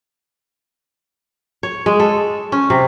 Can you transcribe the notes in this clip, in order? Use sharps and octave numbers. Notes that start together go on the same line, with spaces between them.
C#5
G#3
A4
C#4
C3